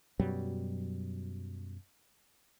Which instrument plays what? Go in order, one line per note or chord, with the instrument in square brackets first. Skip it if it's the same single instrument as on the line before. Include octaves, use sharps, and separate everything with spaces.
[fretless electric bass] F#2 B2 F#3 G3